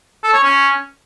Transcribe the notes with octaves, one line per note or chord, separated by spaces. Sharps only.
A4
C#5
C#4